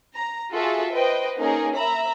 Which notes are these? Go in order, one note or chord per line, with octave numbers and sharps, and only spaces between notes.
A#5
F4 F#4 G#4 A4 E5
B4 C5 D#5 G5
A#3 C#4 D#4 G#4 A#4
E5 A#5 B5